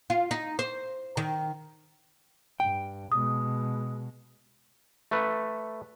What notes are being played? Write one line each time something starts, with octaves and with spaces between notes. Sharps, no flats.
F4
D#4
C5
D#3
G2 G5
B2 G#3 D#6
A3 B4